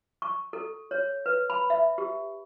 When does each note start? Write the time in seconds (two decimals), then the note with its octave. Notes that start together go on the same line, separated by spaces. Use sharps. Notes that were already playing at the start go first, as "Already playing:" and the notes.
0.22 C#6
0.53 A4
0.91 C#5
1.26 B4
1.50 B5
1.70 E5
1.98 G4